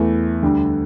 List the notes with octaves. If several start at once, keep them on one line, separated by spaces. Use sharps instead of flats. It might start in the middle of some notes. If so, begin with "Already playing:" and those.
Already playing: E2 E3 A3
D2 D3 G3